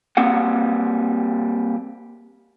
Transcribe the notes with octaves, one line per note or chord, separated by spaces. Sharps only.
G3 A#3 C4 G4 F#5